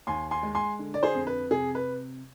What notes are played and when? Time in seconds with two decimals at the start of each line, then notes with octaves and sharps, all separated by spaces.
0.07 D#2 G#5 C6
0.31 G#5 C6
0.43 G#3
0.55 G#5 C6
0.79 D3
0.94 D5
1.03 G#4 C5
1.15 F2
1.27 B4
1.51 C3 G#4
1.75 B4